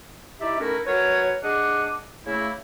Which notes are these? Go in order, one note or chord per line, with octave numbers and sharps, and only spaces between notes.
D#4 E4 G4 D5 E5
A3 C#4 D#4 E4 F#4 A#4
F#3 A#4 B4 C#5
D4 G#4 D#5 F#5 D6
C#3 A3 A#3 E4